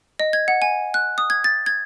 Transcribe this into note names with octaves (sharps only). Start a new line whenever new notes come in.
D#5
G#6
F#5
G#5
F#6
D#6
G#6
A6
G#6